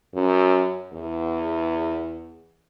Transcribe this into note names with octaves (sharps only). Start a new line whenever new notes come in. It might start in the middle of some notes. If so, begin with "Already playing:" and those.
F#2
E2